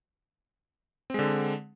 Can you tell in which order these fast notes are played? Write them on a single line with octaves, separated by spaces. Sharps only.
C4 G#3 D3